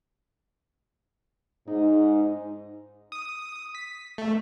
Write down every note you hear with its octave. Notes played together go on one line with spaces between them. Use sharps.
G#2 D#4
D#6
B6
A3